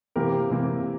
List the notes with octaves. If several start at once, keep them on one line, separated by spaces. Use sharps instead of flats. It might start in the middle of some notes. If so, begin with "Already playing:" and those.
C3 E3 A#3 G4 A#4
C3 E3 A#3